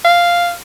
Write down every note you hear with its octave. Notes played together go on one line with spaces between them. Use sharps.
F5